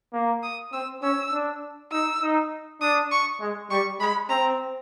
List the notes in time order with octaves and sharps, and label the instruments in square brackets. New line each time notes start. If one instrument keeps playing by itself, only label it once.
[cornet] A#3
[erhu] D#6
[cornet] C4 [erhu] E6
[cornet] C#4 [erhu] E6
[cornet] D4
[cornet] D#4 [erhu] E6
[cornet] D#4
[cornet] D4 [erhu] D#6
[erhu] C#6
[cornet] G#3
[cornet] G3 [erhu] C#6
[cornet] G#3 [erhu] B5
[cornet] C4 [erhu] A#5